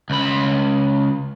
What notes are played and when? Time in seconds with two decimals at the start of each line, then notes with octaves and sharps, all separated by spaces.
0.10 C#2 B5